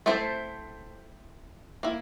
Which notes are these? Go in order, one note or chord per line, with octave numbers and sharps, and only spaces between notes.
A3 C4 E4 A4 C5
A#3 E4